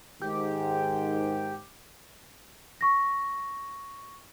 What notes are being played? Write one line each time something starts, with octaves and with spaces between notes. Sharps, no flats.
G#2 D#3 G4
C#6 A#6